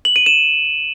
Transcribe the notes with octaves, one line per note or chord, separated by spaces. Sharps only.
F#7
D#7
E7